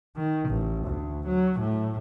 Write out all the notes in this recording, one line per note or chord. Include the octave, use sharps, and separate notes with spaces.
D#3
A1
D2
F#3
A2